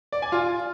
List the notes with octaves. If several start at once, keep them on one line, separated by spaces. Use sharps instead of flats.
D5
G#5
F4